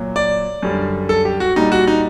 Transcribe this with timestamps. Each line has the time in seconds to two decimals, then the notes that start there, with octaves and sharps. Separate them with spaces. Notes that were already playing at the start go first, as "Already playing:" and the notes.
Already playing: A#2 F#3
0.16 D5
0.62 F#2 D3 G3
1.09 A4
1.25 G4
1.40 F#4
1.56 A#2 G3 D#4
1.72 F#4
1.87 D#4